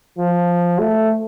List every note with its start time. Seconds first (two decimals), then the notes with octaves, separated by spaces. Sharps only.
0.19 F3
0.79 A3